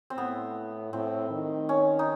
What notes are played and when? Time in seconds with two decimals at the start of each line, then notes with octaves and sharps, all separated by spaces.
0.10 C4
0.17 A2 B3
0.93 A2 C4
1.31 D#3
1.69 C#4
1.99 D#4